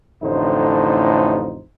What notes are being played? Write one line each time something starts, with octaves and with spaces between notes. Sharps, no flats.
A1 F2 A2 D3 D#4 C5